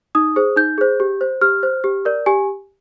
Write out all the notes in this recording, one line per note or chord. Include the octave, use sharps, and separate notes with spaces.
D#4 D#6
G#4 C5
D#4 G6
G#4 C5
G4
C5
G4 F6
C5
G4
A#4 D5
G4 G#5